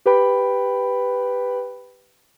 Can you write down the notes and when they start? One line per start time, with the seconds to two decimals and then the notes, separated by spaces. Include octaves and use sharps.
0.06 G4 B4 G5 B5